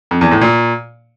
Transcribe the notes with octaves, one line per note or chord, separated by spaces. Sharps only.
F2
E2
A2
A#2